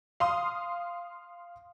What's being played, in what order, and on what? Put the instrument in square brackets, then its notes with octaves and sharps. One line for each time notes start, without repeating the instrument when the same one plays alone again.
[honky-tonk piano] F5 C6 D#6